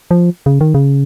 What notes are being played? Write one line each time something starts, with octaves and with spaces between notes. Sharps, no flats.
F3
C#3
D#3
C#3